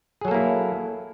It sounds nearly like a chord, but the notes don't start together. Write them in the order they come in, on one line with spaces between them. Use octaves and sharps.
G#4 F#3 A4 A#3 E4